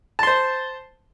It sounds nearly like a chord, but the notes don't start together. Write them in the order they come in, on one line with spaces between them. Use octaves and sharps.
A5 C6 C5